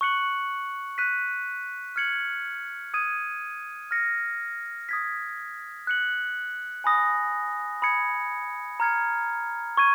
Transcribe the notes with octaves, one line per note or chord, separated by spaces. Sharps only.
C#6 F#6 C#7 F#7
F#6 B6 D#7
F6 G#6 C#7 F#7
D#6 G#6 D#7
F6 A#6 C#7
D#6 G#6 B6
F#6 C#7 F#7
G#5 B5 D#6 A#6
B5 D#6 G#6 C#7
A#5 F6 G#6 C#7
C#6 G#6 D#7